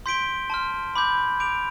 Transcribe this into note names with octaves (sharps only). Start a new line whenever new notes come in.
C6 G6 B6 D7 G7
A5 C6 F6
B5 D6 G6
D6 G6 D7 F7